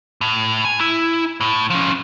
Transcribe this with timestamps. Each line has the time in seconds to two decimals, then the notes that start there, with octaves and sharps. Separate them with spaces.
0.21 A2
0.65 G#5
0.80 E4
1.41 A2
1.70 F3 C#4